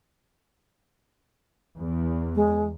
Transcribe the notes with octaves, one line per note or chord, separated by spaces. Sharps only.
E2
G#3